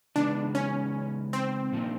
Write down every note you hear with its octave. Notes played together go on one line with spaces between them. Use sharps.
C#3 E3 G#3 B3 D4 D#4
C#4
C4
A#2 F3 A#3 D#4